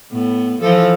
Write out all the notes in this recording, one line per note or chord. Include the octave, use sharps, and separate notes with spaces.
A2 B3
E3 F3 A4